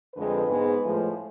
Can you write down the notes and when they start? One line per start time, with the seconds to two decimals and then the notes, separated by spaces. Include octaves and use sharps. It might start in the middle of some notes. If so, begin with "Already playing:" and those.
0.14 F2 D3 G#3 B4
0.47 G#2 G#3 B3
0.82 A2 F3 G#3